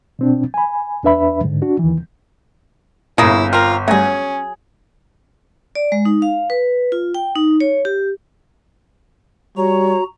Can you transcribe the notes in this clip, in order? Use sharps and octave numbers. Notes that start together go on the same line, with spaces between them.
B2 C4 D4
G#5 B5
E2 D4 B4 E5 B5
G#2 D3
D4 F#4
D#2 D#3 E3
G1 A#2 C#3 A#3 E4 D#6
C4 F4 A#4 F6
F#3 G3 A3 C#4 G#4
D5
G#3
D#4
F5
B4
F4
G5
D#4
C#5
G4
G3 F#4 C#5 A#5